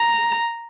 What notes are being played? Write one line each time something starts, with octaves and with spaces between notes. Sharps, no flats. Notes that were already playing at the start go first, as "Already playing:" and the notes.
Already playing: A#5